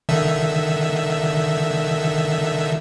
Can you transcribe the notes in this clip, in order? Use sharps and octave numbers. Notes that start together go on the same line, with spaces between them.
D3 D#3 E5